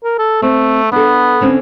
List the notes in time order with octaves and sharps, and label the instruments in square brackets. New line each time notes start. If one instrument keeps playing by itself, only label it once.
[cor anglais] A#4
A4
[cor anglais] A3 [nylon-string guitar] C4
[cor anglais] B3 [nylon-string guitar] D4 A4
[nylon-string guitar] D3 C4 C#4